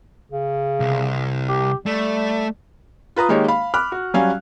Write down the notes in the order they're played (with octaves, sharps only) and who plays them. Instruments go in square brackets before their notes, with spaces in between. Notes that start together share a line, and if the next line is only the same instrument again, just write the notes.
[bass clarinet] C#3
[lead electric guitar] C2
[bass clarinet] G4
[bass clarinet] G3 [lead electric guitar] A3
[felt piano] F4 B4 A#5 D#6
D#3 G#3 A#3 D#4 G4 C#5
F5 B5
B5 D6 F6 F#6
F#4
F#3 G3 C#4 F5 G#5